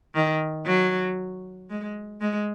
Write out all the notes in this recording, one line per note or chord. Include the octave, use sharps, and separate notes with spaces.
D#3
F#3
G#3
G#3